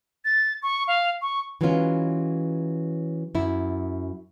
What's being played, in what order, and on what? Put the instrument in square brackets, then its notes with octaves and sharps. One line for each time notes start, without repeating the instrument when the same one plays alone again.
[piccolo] A6
C#6
F5
C#6
[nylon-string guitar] E3 F#3 G#3 B3 C#4 F4
F#2 E4